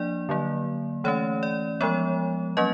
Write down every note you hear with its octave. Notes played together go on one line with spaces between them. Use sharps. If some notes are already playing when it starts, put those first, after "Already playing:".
Already playing: F3 A#3 D4 D5
D3 F#3 A#3
E3 A3 C#4 C#5
D5
F3 G#3 B3 C#5
F#3 A#3 C#4 D#5